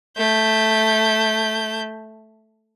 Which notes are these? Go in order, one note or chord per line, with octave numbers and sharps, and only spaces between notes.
A3 G6